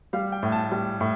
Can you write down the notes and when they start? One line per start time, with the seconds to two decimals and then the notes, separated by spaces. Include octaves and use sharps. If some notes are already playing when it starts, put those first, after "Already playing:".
0.13 G3 F5
0.32 G5
0.43 A2
0.52 A5
0.72 G3
1.01 A2